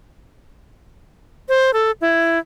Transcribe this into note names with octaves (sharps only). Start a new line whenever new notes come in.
C5
A4
E4